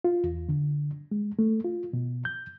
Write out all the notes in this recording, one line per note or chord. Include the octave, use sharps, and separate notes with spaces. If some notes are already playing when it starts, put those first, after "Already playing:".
F4
E2
D3
G#3
A3
F4
B2
G6